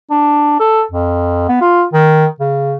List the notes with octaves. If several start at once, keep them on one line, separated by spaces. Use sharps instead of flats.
D4
A4
F2
B3
F4
D#3
C#3